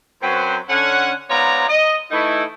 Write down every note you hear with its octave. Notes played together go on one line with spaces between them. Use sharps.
F#2 F#3 C4 B4 C5
D3 C#4 F#5
G#2 B3 F4 C#5 D5 A#5
D#5
E3 A3 D#4 E4